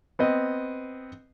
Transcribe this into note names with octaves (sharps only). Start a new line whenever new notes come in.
B3 C4 D#5